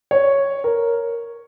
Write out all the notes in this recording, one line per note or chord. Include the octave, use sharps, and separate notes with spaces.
C#5
A#4